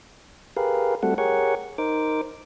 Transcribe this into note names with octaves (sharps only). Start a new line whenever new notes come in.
G4 G#4 A#4 B4 F5
G3 A3 C4 F#4 A4 F#5
G4 G#4 A#4 C#5 F#5 C#6
D#4 A#4 C5 D6